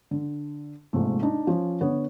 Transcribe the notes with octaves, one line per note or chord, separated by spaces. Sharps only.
D3
A#1 G#2 C3 A3
D4 D#4
F3 C#4
D3 B3 C#5